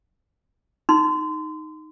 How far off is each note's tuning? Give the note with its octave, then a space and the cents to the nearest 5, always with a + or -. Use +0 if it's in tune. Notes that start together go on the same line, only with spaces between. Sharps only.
D#4 +0 C6 -30